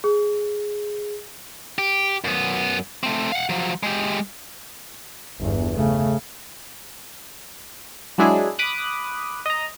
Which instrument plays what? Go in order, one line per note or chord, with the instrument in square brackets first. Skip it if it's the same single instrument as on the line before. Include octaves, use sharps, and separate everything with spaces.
[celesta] G#4
[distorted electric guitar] G4
F#2 B3
A3 C4
F5 F#5
F3 F#3
G#3 G4
[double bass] G1 E2
C#3 A3
[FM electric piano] F#3 G#3 D4 E4 G#4
B5 D6 D#6 F#6
D#5 A#5